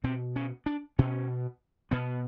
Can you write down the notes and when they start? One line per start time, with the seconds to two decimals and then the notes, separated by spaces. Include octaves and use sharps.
0.04 B2 C4
0.36 C#4
0.66 D4
0.99 B2 C#4
1.91 B2 B3